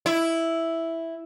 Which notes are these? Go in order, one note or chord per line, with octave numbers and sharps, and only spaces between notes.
E4